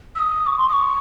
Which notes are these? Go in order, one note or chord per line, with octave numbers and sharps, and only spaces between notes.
E6
D#6
C#6
C6
D#6
C#6